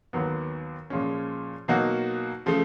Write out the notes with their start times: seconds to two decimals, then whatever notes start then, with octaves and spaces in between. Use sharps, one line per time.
0.13 D#2 D#3 F#3 B3
0.90 A#2 F3 G#3 C#4
1.68 B2 F#3 A#3 D#4 F#4
2.46 C#3 F3 A3